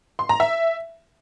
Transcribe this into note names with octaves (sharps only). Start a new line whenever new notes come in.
C6
A#5
E5